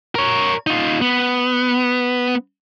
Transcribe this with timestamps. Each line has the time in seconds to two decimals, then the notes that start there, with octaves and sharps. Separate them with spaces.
0.15 A#4 C#5
0.67 D#4 F4
1.01 B3